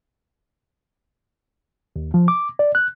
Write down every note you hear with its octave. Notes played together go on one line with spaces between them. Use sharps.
D#2
F3
D6
D5
F#6